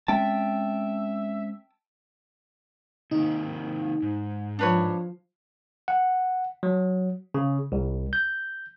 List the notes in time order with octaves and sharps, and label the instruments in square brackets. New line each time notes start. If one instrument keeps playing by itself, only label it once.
[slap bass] G#3 C4 C#4 [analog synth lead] E5 [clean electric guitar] G5 A5
[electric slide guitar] C3 D#3 A#3 [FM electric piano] D#4
[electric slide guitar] G#2
[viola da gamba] F3 [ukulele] D4 B4 C#5
[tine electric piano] F#5
F#3
C#3
C2
G6